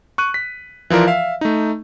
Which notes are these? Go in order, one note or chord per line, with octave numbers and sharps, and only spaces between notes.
C#6 F#6 D#7
B6
E3 F3 F4 A#4 D5
E5 F5
A3 D#4